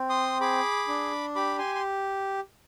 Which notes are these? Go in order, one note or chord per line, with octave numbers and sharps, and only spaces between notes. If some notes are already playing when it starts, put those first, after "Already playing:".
Already playing: C4
C6 D#6
G#4 B5 D6
D4
G4 B5 D6
G#5 C6
C6